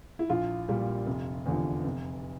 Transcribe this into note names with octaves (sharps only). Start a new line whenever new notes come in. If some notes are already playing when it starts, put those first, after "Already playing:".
E4
A#1 F4
A#2 G3
F1
E2 D3 F3
F1